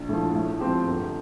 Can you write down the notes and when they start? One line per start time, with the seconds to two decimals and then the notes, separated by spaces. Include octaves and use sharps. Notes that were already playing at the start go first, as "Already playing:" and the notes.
Already playing: A#1
0.09 A2 F3
0.35 A2
0.60 F3 C4 G4
0.86 G1